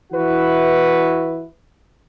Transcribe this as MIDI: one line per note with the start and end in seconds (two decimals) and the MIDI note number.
0.13 1.45 52
0.13 1.45 64
0.13 1.45 66
0.13 1.45 71